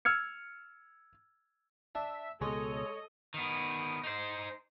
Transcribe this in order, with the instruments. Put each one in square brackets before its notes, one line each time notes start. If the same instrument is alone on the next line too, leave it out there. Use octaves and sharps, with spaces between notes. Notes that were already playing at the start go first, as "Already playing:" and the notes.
[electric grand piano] E6 F6 G#6 C#7
[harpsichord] D4 [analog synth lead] E5
[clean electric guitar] C#2 B2 [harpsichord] G#3 [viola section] A4 D#5 [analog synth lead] C#5
[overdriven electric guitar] D#3 B3
D#4 C5